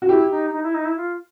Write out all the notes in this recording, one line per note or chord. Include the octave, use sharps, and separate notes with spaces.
F#4
E4 G4
D#4
D#4
E4
D#4
E4
F4